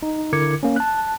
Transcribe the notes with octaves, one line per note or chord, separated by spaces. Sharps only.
D#4
D3 E4 A#4 D6 G#6 C#7
A#3 C#4
A5 F#6